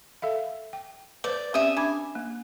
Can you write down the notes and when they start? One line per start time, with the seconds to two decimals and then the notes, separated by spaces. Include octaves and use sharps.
0.22 A4 E5 F5
0.73 G5
1.24 B4 C5 D5
1.54 C4 C#4 G4 E5 D#6
1.77 D4 G#5 B5 D6
2.15 A#3